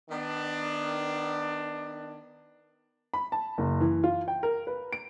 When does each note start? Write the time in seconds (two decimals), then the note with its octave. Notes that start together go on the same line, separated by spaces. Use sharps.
0.10 D#3 B3 D4
3.14 B5
3.32 A5
3.58 F#1
3.81 E3
4.04 F4
4.28 G5
4.43 A#4
4.67 B4
4.92 D7